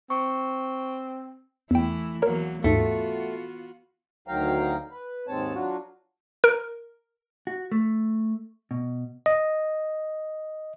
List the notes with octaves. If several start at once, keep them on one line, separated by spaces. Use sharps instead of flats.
C4 C#6
E2 E3 A3 E4 G5
E2 F#3 A#3 A#4 C#5 A#5
D#2 G#2 A3 B3 F4 F#4
D2 D#3 F#3 F5 G5 A#5
B4
D#2 G#2 G#3 C4 C#5 A5
F#3 D4 F4 F#4
A#4
F#4
A3
B2
D#5